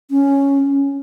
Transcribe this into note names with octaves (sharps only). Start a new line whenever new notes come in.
C#4